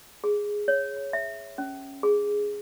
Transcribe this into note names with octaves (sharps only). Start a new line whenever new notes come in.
G#4
C#5
E5
C#4
G#4